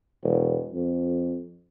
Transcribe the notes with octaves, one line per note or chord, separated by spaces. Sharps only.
E1
F2